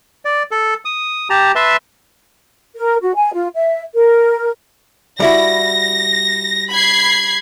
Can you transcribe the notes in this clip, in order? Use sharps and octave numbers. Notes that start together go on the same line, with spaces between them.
D5
A4
D#6
G4 A5 A#5
B4 E5 A5 C6
A#4
F#4
G#5
F4
E5
A#4
G3 E4 F#4 A#6
B5 G#6 C7